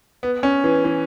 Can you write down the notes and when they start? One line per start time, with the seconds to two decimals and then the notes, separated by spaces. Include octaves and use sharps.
0.23 B3
0.43 C#4
0.64 E3
0.84 E3